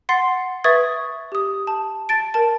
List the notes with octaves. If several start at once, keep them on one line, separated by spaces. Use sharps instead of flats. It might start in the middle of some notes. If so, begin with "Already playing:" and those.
F#5 C6 A6 C7
B4 E5 C#6 D#6 G#6 A6
G4 D#6
A5
A5 A6 D7
A#4 A5